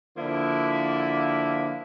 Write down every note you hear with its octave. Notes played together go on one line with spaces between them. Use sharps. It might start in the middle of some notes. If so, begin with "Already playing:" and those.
D3 F3 A#3 E4